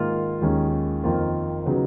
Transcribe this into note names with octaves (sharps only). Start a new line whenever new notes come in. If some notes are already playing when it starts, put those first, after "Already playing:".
Already playing: G#2 D#3 A#3 F4
D#2 D#3 G#3 C#4 F4
F2 D#3 A#3 F4
C#3 F#3 B3 D#4